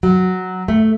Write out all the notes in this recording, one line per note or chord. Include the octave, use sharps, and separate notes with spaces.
F#3
A3